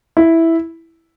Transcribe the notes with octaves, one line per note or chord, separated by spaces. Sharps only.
E4